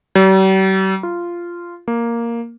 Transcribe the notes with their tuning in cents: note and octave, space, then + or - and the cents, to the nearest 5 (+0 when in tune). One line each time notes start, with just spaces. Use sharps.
G3 -45
F4 -10
A#3 +0